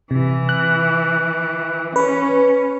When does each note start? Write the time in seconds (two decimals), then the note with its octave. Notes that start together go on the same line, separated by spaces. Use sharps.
0.11 C3 E3
0.49 F#6
1.96 C#4 B4